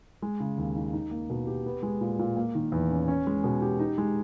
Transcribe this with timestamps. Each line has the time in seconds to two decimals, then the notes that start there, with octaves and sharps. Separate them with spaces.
0.22 G#3
0.40 C#3
0.58 D#2
0.76 D#4
0.93 D#4
1.11 A#3
1.30 B2
1.47 G4
1.66 B3
1.83 G#3
2.01 A#2
2.19 A#2
2.37 A#3
2.55 D#3
2.72 E2
2.91 C#4
3.08 C#4
3.27 G#3
3.44 B2
3.62 G4
3.80 D#4
3.98 G#3